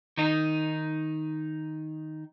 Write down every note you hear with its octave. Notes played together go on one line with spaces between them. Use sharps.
D#3 D#4